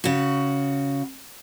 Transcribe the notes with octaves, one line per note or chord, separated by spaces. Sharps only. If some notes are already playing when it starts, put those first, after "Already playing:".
C#3 F#4